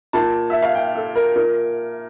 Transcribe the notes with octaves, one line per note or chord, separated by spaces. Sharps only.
A#2 A5
E5
F5
G5
A4
A#4
A#2 A#4